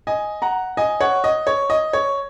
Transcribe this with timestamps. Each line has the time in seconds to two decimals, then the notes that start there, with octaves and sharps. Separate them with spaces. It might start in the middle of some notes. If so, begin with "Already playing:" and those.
0.07 D#5 G#5
0.42 F#5 A#5
0.77 D#5 G#5
1.01 C#5 F#5
1.24 D#5
1.47 C#5
1.70 D#5
1.93 C#5